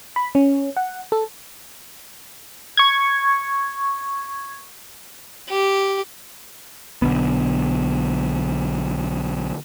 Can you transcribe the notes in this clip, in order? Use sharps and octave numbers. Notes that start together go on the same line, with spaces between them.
B5
C#4
F#5
A4
C#6 G#6
G4
B1 D3 B3